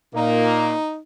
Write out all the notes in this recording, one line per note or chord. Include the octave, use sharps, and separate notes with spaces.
A#2 A#3 D#4